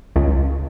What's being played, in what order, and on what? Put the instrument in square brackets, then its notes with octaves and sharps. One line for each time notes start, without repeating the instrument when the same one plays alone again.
[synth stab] C#2